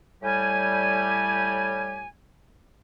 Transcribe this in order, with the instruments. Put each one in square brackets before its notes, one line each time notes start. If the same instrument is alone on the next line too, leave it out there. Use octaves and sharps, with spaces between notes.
[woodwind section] A2 G3 G4 G#5